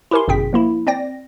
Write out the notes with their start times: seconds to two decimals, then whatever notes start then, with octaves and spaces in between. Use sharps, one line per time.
0.11 E4 G4 A#4 G#5 C6
0.28 G1 F#2 B2 G#4 G5 B6
0.53 F3 A#3 E4
0.87 C4 D5 G5 A#6